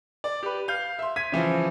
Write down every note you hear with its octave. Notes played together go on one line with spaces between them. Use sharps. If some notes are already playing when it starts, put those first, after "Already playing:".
D5
G4 B4
F5 G6
E5 C6
G#6 B6 D#7
C#3 E3 F3 F4